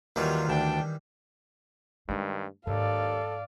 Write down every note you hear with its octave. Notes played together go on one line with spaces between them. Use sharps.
D#2 D#3 E3 F#3 G3 F4
D2 D4 G5
G2 D#3 G#3 D4
D#2 G#2 A4 D5 F5